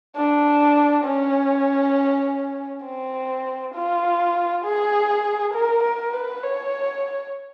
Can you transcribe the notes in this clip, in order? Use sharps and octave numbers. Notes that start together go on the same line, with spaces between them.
D4
C#4
C4
F4
G#4
A#4
A#4
B4
C#5